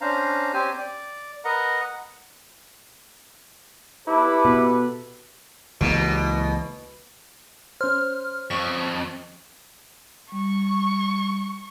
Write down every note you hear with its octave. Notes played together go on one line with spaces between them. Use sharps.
C#4 D4 C5 F5 A#5
C4 C#4 G4 C5 G#5
D5
A#4 B4 D#5 F#5 A#5
F#5
E4 G4 A4 B4 D6
B2
C#2 B2 E3 A#3
C#4 C5 F6
F2 C#6
G3 C#6